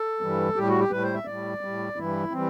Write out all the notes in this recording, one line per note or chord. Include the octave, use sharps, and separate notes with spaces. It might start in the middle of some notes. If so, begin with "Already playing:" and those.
Already playing: A4
G2 E3 G3
A2 G3 G4
F#4
G4
A2 G3 B4
C5
E5
A2 G3 D5
A2 G3
G2 E3 G3 E4
E3 G3 C4